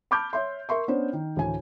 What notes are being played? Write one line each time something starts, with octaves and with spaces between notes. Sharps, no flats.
A5 B5 D6 F6 G6
C#5 E5 C6
A#4 E5 C6 C#6
B3 C#4 D4 C5 C#5
D#3
D2 A2 E3 G#5